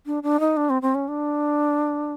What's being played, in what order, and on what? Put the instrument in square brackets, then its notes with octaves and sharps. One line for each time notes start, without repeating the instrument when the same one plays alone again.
[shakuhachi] D4
D4
D#4
D4
C4
C4
C#4
D4